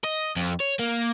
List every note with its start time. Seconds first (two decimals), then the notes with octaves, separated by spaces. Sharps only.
0.04 D#5
0.36 F2
0.60 C#5
0.79 A#3